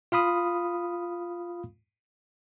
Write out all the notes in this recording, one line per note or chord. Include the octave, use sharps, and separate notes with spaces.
F4 F5 B5 D#6